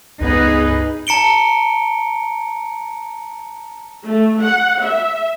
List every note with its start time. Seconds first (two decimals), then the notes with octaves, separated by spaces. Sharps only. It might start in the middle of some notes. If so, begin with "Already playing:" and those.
0.21 C#2 G2 B3 D#4 G#4 B4
1.07 A5 A#5 C#7 D7 G7
4.05 A3
4.40 F#5
4.80 E5